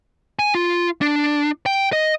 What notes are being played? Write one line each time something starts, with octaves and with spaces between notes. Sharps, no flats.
G#5
F4
D4
G5
D#5